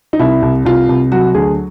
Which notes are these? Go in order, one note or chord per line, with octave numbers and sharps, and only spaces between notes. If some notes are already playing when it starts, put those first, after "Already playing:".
D#4
C2 E4
C2
C2 F4
C2
F#3 F#4
D2 G#4